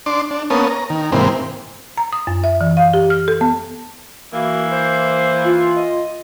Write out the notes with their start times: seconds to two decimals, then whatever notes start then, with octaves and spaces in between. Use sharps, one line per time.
0.06 D4 C6 D6
0.31 D4
0.50 A#3 B3 C#4 A5 D#6
0.70 A#5
0.90 D#3
1.12 G#2 C3 E3 A#3 C4
1.97 A#5
2.13 D#6
2.27 F#2
2.44 E5
2.61 E3
2.77 F5
2.94 G4
3.10 F6
3.28 A4
3.41 B3
4.33 E3 A#3 F#4
4.72 C5
5.45 F4
5.76 D#5